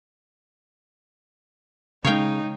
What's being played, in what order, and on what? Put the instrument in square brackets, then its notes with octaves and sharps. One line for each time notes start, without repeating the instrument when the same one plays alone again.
[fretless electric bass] C#3 G#3 [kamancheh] D#4 [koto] C#5 F5 G5